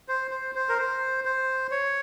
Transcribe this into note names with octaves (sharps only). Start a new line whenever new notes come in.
C5
C5
C5
A#4
C5
C5
C#5